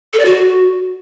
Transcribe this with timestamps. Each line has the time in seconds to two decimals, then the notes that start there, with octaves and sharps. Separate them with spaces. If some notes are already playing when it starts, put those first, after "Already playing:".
0.13 A4
0.19 D5
0.25 F#4